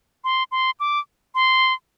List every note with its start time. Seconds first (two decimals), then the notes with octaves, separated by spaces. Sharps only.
0.24 C6
0.52 C6
0.80 D6
1.35 C6